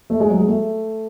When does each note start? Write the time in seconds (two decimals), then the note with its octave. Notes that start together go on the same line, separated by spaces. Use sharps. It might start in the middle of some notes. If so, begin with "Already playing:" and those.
0.10 A3
0.20 G#3
0.30 F#3
0.39 G#3
0.47 A3